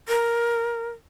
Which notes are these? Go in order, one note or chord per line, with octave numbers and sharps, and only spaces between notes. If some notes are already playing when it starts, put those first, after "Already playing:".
A#4